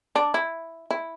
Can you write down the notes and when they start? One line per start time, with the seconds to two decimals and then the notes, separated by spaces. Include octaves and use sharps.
0.16 D4
0.34 E4
0.90 E4